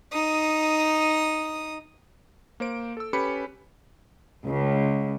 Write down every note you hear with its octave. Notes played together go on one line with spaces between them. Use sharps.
D#4 D#6
A#3 C5 D7
A4 E6
C#4 G4 A4 B4 B5 C#7
C#2